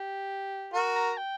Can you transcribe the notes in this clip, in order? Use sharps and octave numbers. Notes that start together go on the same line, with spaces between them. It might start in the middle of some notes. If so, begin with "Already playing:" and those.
Already playing: G4
F#4 A#4
A#5
G5